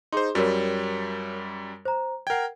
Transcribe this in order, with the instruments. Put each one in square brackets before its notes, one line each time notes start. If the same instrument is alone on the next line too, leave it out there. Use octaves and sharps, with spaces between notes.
[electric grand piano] D#4 C5 [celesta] G#4 C6
[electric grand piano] F#2 G3 [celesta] F#4 A#4 C#5
[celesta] C5 A#5
[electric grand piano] A#4 G5 [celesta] F#5 G#6